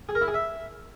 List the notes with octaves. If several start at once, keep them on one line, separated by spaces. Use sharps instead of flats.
G#4
A#4
E4
G#4
E5